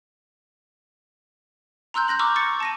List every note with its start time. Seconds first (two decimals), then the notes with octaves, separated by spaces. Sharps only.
1.94 A#5 C6 E6 F#6 G6
2.08 F#6 G6 A#6 F#7
2.19 A#5 C#6 D6 E6 F6 G6
2.36 C#6 A6 C#7
2.60 A5 A#6 D#7